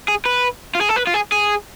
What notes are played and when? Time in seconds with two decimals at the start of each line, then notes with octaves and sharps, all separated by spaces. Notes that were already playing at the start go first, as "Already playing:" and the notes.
0.08 G#4
0.25 B4
0.75 F4
0.81 G#4
0.89 A4
0.96 B4
1.07 F4
1.14 G#4
1.32 G#4